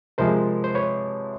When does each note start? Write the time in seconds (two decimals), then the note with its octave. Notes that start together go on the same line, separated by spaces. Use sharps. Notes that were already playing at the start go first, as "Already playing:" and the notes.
0.18 C3 F3 G#3 A#4 C5
0.64 C5
0.75 B4 C#5